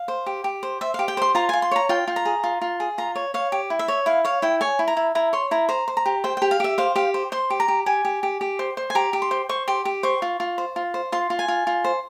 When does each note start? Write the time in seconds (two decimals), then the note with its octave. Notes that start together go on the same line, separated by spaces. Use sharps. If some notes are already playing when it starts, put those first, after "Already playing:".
Already playing: F5
0.08 C5
0.26 G4
0.44 G4
0.63 C5
0.81 C5 E5
0.94 F5
0.99 G4
1.08 G5
1.17 C5 C6
1.35 F4 A#5
1.49 F4 G#5
1.62 C6
1.71 C#5 A#5
1.89 F4 G5
2.08 F4
2.16 A#5
2.25 G#4
2.44 F4
2.62 F4
2.80 G#4
2.98 F4 A#5
3.15 C#5
3.34 C#5 F5
3.52 G4
3.70 E4
3.79 E5
3.88 C#5
4.06 E4 F5
4.25 C#5 F5
4.42 E4 G5
4.61 C#5 G#5
4.79 E4
4.88 A#5
4.97 E4
5.15 E4 A#5
5.33 C#5 C6
5.51 E4 A#5
5.69 C5 A#5
5.88 C5
5.97 A#5
6.06 G4
6.24 C5 G5
6.37 G5
6.42 G4
6.51 F5
6.60 G4 E5
6.78 C5 F5
6.96 G4 F5
7.14 C5
7.32 C5 C6
7.50 G4
7.60 A#5
7.68 G4
7.86 G4 G#5
8.05 G4
8.23 G4
8.41 G4
8.59 C5
8.77 C5
8.90 G#5
8.95 G4 A#5
9.13 G4
9.22 C6
9.31 C5
9.49 C5 C#6
9.68 G4 C6
9.85 G4
10.03 C5 C#6
10.22 F4
10.40 F4
10.58 C5
10.76 F4
10.94 C5
11.12 F4 C6
11.30 F4
11.39 G#5
11.48 F4
11.67 F4
11.84 C5